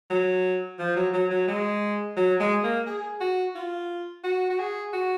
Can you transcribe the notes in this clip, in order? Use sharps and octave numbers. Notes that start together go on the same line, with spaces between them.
F#3
F3
F#3
F#3
F#3
G#3
F#3
G#3
A#3
G#4
F#4
F4
F#4
F#4
G#4
F#4